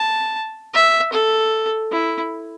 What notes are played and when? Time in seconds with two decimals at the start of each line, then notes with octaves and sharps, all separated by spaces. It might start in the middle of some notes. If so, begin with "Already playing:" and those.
Already playing: A5
0.74 E5
1.12 A4
1.92 E4